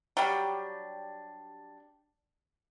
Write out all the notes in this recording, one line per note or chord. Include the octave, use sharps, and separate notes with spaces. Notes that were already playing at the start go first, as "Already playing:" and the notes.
F#3 G3 D4 G4 F6